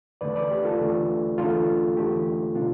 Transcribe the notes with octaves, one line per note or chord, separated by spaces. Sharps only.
E2 D3 A3 B4 D5
B4 D5
G4
F4 A4
E2 D3 A3
E2 D3 A3 F4 A4
E2 D3 A3 G4
B2 B3 D4 F4